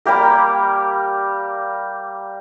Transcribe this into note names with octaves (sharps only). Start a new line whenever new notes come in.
G3 A#3 G4 A#4